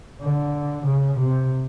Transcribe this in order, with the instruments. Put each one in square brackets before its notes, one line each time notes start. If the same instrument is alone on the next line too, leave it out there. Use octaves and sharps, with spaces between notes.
[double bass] D3
C#3
C3